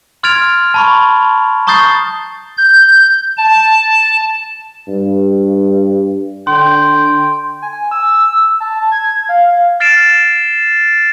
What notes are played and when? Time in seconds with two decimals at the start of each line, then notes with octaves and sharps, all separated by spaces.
0.23 C6 F6 G#6 A6 D7 F7
0.74 A5 B5 C#6
1.67 A#5 C#6 D#6 G6 A6 C7
2.57 G6
3.37 A5
4.88 G2
6.47 D3 G5 C6
7.62 G#5
7.91 E6
8.60 A5
8.92 G#6
9.29 F5
9.80 F6 A6 C7 D7 E7